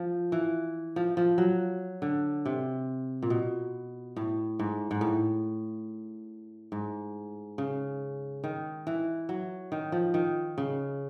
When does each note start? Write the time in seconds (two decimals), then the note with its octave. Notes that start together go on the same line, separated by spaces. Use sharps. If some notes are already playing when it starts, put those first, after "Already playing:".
Already playing: F3
0.32 E3
0.96 F3
1.17 F3
1.38 F#3
2.02 D3
2.45 C3
3.22 A#2
3.30 B2
4.16 A2
4.59 G#2
4.91 G#2
5.01 A2
6.72 G#2
7.58 C#3
8.44 D#3
8.87 E3
9.29 F#3
9.72 D#3
9.92 F3
10.14 D#3
10.58 C#3